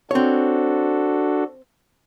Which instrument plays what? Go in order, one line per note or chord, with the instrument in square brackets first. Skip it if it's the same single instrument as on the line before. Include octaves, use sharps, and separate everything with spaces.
[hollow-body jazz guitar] C4 C#5 [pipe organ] D4 F#4 A4